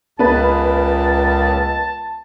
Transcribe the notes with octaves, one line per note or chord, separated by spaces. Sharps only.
C#2 A#2 C#3 B3 B4 A5